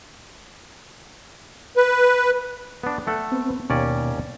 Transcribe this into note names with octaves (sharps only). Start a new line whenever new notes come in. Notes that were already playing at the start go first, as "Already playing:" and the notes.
B4
B3 D4
A3 A4 F#5
B3 C4
D#2 B2 C#4 D5